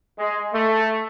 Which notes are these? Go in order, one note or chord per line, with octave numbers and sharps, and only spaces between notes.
G#3
A3